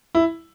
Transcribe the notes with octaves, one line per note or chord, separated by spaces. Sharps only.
E4